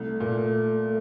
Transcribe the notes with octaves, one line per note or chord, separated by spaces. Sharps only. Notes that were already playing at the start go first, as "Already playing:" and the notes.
Already playing: C2 A3
A#2